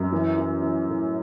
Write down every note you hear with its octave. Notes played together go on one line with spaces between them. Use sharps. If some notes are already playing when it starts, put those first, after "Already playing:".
Already playing: F#2
E3
E3
E3
A2